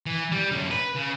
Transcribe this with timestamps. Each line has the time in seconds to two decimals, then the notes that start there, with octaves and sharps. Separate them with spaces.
0.06 E3
0.32 G3
0.51 F#2 D3
0.71 B4
0.96 C#3